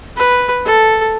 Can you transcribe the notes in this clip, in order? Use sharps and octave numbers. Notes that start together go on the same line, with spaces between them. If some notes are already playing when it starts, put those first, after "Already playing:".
B4
A4